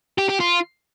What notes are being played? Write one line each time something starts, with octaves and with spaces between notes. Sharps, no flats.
G4
G4
F4